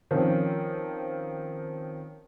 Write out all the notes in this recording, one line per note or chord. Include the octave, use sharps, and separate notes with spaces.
D#3 F3 C4 C#4